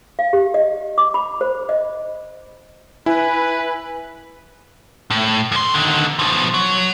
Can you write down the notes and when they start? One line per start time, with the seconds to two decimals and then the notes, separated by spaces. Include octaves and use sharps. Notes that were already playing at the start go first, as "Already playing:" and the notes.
0.19 F5
0.33 G4
0.54 D#5
0.98 D6
1.14 B5
1.41 C5
1.69 D#5
3.06 E4 B4 G#5
5.10 A2
5.52 F#2 C6
5.74 D3 D#3
6.19 B2 F3
6.54 F#3